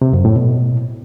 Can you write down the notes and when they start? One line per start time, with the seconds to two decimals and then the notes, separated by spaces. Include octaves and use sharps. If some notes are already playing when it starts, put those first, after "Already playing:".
0.02 C3
0.13 F#2
0.25 A2
0.36 B2